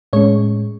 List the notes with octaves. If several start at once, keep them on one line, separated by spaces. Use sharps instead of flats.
A2 G#3 C#4 C#5